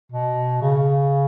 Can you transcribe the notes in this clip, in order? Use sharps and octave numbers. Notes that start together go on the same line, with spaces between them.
B2
C#3